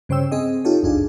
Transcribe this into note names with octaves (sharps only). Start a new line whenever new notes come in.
G2 C#3 C5 C#5 G5 E6
C4 G#4 D#5
D#4 F4 G4 A4 C#5
G1 C#2 F#2 D4 F4 G#4